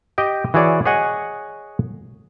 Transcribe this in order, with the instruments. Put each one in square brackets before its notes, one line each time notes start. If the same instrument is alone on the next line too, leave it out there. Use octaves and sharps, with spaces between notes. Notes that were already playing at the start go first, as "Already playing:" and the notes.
[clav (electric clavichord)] G4 D#5 G5
E3 F#4 G#4 C#5 D5
G#4 C#5 D#5 F#5 G#5